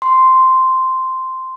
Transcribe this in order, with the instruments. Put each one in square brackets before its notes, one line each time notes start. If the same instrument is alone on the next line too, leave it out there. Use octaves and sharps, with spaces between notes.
[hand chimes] C6